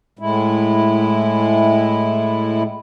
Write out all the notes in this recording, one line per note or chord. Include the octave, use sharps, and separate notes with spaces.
A2 G#3 E4